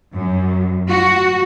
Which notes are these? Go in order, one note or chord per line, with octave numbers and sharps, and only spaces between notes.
F#2
F#4